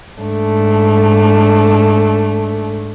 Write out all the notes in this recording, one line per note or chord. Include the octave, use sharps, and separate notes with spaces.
G#2 A3 D4